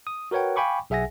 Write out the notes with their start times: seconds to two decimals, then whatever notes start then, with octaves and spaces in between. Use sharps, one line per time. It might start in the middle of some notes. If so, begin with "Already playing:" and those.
0.07 D#6
0.31 F#4 A#4 B4 C#5 F#5 G5
0.56 F5 G5 G#5 B5 C#6 D6
0.90 B1 G#4 E5 F#5 G#5 A#6